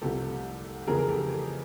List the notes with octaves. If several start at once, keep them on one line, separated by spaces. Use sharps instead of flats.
C2 C3 F3 A3 G4 A4
F2 C#3 E3 A3 G#4 A#4
A#4
G4 A4